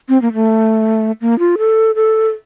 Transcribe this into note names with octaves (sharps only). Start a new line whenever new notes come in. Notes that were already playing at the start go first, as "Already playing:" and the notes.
C4
A#3
A3
A#3
F4
A4
A4